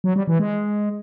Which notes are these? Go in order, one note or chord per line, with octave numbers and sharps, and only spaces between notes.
F#3
G3
E3
G#3